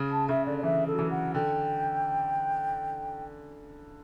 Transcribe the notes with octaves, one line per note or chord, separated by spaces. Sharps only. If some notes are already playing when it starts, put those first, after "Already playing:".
Already playing: C#3
A5
C#3 E5
D3 D5
D5
E3 E5
A4
F#3
E3
F#5
D3 G5